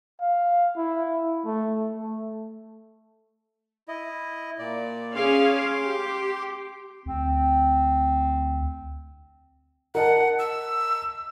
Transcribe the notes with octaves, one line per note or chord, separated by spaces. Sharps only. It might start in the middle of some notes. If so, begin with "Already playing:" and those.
F5
E4
A3
A3
E4 D#5
A#2 D5
C#4 G#4 F5 C6 D6
G4
D2 C4
A#4 D#5 F#5 A5
E6